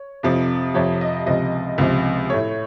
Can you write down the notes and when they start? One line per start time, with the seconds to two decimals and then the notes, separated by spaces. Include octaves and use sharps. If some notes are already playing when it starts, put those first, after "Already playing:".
Already playing: C#5
0.23 F2 C3 F3
0.74 F2 C3 F3 C#5
1.01 D#5
1.26 C#2 C3 F3 D#5
1.78 C#2 C3 F3
2.30 A2 A3 C#5